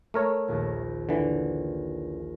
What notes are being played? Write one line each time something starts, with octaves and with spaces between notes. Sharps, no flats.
A3 A#4 C#5
A#1 D#2
D3 E3